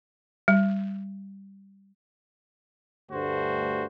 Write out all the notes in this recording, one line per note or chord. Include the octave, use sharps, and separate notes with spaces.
G3
D2 G2 G3 A3 F#4 C5